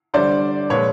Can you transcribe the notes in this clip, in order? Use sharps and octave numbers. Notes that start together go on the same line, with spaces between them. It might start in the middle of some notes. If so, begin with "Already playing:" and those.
D3 G3 C5 D5
A#2 F3 G#3 B4 C#5